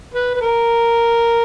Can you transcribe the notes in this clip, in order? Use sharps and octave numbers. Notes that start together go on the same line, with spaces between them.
B4
B4
A#4